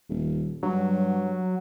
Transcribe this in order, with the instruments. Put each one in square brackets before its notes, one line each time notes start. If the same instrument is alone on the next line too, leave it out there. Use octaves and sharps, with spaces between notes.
[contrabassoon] D#1
[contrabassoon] G2 [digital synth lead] F#3